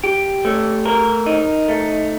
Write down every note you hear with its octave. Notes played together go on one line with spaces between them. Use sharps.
G4
A3
A#4
D#4
A3